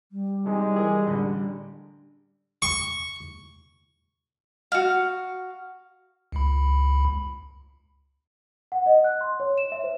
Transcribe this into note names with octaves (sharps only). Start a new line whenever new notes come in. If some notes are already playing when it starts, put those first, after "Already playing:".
G3
C3 G#3 D#4
E3 G#4 A#4
A1 D3 B5
C#6
F#4 F5
C#2 B5
F#5
D#5
F#6
C6
C#5
E7
E5
C5